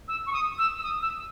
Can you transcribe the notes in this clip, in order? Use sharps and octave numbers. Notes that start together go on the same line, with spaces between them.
E6
C#6
D#6
E6
E6
D#6
E6